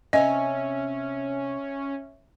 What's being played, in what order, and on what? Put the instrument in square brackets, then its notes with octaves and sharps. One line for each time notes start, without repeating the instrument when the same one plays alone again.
[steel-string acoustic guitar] C3 C#5 G#5 [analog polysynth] C#4 [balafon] D#5 [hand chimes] E5